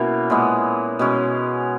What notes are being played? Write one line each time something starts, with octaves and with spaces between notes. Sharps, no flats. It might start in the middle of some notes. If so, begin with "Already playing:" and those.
Already playing: B2 A#3 C#4 E4
A#2 G#3 B3
B2 G#3 C#4